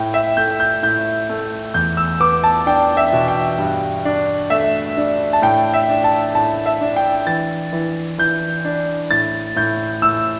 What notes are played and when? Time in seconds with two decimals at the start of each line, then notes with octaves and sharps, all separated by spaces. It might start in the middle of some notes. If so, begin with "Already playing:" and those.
Already playing: A2 G5
0.14 E5
0.37 A3 G6
0.60 G6
0.83 A2 G6
1.29 A3
1.74 E2 G6
1.97 E6
2.20 B3 D6
2.44 A5
2.66 D4 G5
2.97 E5
3.13 B2
3.28 G5
3.58 G2
4.05 D4
4.50 A3 E5
4.97 D4
5.33 A5
5.42 A2 G5
5.74 E5
5.89 D4
6.04 A5
6.35 A2 A5
6.66 E5
6.81 D4
6.96 G5
7.27 E3 A6
7.73 E3
8.18 E3 G6
8.65 D4
9.11 A2 A6
9.56 A2 G6
10.02 A2 E6